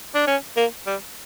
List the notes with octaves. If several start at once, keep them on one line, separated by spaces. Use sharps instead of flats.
D4
C#4
A#3
G3